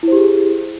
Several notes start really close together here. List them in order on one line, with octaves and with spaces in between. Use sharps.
E4 C5 G4 G#4